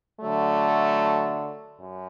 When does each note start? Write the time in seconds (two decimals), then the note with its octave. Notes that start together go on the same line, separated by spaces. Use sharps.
0.19 D3 F#3 A3
1.79 F#2